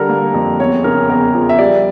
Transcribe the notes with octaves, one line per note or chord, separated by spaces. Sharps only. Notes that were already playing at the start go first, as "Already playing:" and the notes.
Already playing: D3 G3 A4 A#4
A#3
F2
E2 C#5
C#3 A#4
E2 A#4
F3
E5
G3 D5